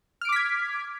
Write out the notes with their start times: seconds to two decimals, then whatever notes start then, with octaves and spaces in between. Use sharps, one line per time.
0.21 F6
0.25 D7
0.29 D6
0.32 B6
0.36 G#6